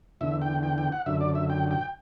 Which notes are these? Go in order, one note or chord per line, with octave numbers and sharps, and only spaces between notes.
E2 D3 E5
G5
G5
G5
F#5
F#2 D3 E5
D5
E5
G5
G5